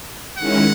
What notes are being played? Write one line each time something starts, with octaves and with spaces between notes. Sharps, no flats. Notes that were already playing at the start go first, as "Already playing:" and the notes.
D#3 G#3 C#4 E4 F#5